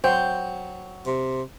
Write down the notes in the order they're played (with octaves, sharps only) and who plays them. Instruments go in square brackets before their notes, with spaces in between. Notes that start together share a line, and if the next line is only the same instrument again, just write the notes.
[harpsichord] F#3 [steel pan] C5 [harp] G5
[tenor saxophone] C3